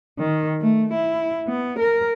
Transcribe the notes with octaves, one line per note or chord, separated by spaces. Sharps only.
D#3
A3
E4
B3
A#4